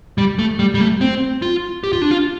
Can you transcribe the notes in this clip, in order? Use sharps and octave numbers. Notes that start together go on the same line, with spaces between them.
G3
A3
G3
G3
A3
C4
F4
G4
F4
D4
F4